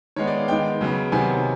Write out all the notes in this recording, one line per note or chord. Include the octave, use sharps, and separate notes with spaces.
D#3 G#3 B3 C#5
D5
F5
D#3 G#3 B3 G5
C#3 F#3 B3
C3 D#3 F#3 B3 G#5